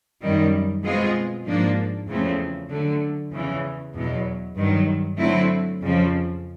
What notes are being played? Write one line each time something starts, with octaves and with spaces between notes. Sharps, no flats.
F#2 D#3 G3
B2 G#3 C4 F4 G#4
G#2 F3 A#3 D4
E2 C#3 F3 A3 C4
D3 F#3 A3
E2 C#3 E3
E2 B2 F#3
G2 D#3 F#3
D3 F#3 A3 C4 E4
F2 C#3 F3